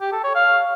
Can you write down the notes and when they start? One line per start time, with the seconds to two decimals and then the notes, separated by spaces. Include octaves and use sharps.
0.01 G4
0.12 A4
0.24 C#5
0.35 F5